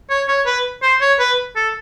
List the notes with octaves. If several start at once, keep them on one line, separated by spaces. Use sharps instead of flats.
C#5
C#5
B4
C5
C#5
B4
A4